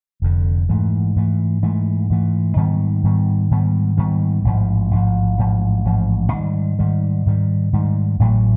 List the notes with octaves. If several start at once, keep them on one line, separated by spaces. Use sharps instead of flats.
F1 F2 D3
G#2 E3 A3
G#2 E3 A3
G#2 E3 A3
G#2 E3 A3
G#2 D#3 G3 B3
G#2 D#3 G3 B3
G#2 D#3 G3 B3
G#2 D#3 G3 B3
A1 G#2 F3
A1 G#2 F3
A1 G#2 F3
A1 G#2 F3
G#2 D#3 G3
G#2 D#3 G3
G#2 D#3 G3
G#2 D#3 G3
A1 A2 F#3 A3